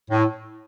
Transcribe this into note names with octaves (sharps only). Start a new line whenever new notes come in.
A2